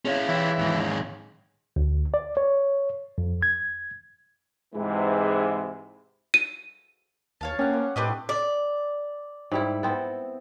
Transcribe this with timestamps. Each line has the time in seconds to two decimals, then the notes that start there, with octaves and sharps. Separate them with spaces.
0.05 C#4 E4 G#4 C#5 F5
0.29 E3 E4 G4
0.59 D#2 G#2
1.76 D2
2.14 D5
2.37 C#5
3.18 F2
3.42 G#6
4.75 G#2 C3 E3 G#3
6.34 D#7
7.41 D#2 C#5 F5 A5
7.59 A#3 C#4 G4 F#5
7.73 C5
7.96 A2 C4 D4 F#4 G4 B4 D#5
8.29 D5
9.52 G#2 G3 E4
9.83 B3 C4 A4